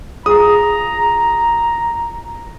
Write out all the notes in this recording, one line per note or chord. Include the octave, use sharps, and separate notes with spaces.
F4 G#4 A#5 D#6